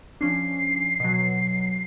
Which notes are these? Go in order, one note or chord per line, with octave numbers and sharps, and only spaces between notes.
F3 C#4 D4 C7
B2 F#3